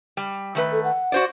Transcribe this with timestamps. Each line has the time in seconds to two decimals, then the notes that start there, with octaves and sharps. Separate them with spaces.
0.17 G3
0.55 D#3 A3 B4
0.72 A4
0.84 F#5
1.12 F#4 C5 D5